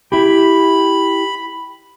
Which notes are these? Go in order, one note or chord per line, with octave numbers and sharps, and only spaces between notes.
E4 G4 B5